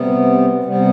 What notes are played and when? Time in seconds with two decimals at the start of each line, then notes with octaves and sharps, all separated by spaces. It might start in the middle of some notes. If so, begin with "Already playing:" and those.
Already playing: C3 G3 B3
0.64 C3 G3 B3